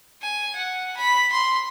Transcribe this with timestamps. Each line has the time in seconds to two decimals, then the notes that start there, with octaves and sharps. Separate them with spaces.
0.21 G#5
0.55 F#5
0.96 B5
1.32 C6